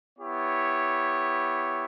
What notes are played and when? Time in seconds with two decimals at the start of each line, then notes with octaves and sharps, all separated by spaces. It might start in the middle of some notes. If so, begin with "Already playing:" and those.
0.18 B3 E4 G4 C#5